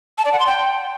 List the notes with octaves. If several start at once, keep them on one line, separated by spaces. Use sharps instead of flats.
A5
D5
F#5
C6
G5